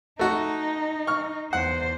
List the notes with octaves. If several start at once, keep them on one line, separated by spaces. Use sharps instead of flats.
A3 D#4 F#4
C#6 F6
E2 C5 F#5